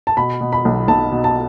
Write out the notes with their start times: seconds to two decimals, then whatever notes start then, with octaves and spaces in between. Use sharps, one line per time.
0.07 A5
0.17 B2 B5
0.41 B2
0.53 B5
0.65 B1
0.88 B1 A5
1.12 B2
1.24 A5